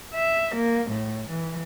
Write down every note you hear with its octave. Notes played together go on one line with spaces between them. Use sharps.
E5
A#3
A2
E3